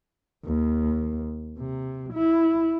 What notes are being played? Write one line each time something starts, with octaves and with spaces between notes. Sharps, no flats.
D#2
C3
E4